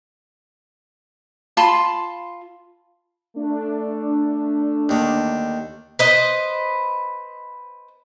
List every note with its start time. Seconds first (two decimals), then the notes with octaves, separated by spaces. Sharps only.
1.57 F4 A5 B5 C6
3.36 A3 D4
4.89 D#2 D3
5.99 B4 C5 D#5